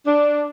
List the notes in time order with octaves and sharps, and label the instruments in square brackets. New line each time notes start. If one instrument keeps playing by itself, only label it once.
[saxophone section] D4